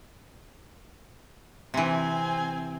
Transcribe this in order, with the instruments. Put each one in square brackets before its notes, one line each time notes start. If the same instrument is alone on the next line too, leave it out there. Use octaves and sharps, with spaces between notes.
[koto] C3 E3 [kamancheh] C4 G#5